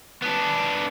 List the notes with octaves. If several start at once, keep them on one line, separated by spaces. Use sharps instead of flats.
B3 D4